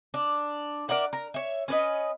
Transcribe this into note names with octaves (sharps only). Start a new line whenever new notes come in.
D4
A#4 D5 E5 F#5
A#4
C#5 E5
C#4 B4 D#5